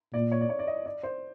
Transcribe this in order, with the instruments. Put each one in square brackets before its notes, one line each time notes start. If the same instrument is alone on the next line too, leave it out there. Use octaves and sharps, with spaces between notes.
[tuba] A#2 [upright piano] D5
[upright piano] C#5
D5
C#5
D5
D#5
D5
C5